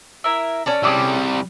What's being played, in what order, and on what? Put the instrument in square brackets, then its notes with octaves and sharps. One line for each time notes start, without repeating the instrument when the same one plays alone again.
[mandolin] E4 A#4 E5
[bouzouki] C#4 A4 D5
[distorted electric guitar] C3 G3 [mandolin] G#4 D6 E6